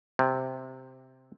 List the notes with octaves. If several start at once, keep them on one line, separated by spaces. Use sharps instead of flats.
C3